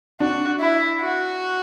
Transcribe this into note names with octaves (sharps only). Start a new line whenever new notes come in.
D4 F#4
E4
F#4